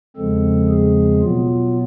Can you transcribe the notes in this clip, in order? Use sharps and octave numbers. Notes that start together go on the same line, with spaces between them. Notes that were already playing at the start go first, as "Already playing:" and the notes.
E2 C#3 F3 G#3 C4 A4
G#4
B2 F#3 B3 F4